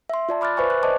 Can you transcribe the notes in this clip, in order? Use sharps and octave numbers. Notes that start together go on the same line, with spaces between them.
E5 C6
F4 D5 A5
B5 D6 F6 F#6 A6
B4 C5 E5 G#5 C#6
F#6
C5 D5 D#5 A5 D6